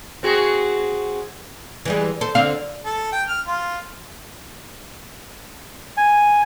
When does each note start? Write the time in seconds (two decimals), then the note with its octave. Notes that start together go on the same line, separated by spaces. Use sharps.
0.23 C4 F#4 G#4
1.85 E3 G3 G#3
2.21 A4 C5
2.35 D3 C4 F5
2.85 A4
3.12 G5
3.28 F6
3.47 F4
5.97 G#5